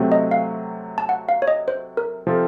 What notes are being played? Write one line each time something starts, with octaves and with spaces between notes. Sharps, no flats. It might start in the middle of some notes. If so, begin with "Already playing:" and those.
Already playing: C3 F#3 A3 C4
D#5
F5
A5
F#5
F5
C#5
D#5
C5
A#4
C3 F3 C4 F4 A4